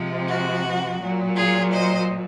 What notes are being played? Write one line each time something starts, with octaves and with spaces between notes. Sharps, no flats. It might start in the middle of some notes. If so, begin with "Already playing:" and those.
Already playing: C3 F3 G#3
F#4
A#2 F#3
F4 G#4
C5 D#5